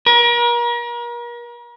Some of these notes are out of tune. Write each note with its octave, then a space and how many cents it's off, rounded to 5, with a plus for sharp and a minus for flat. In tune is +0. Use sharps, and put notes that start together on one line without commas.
A#4 +40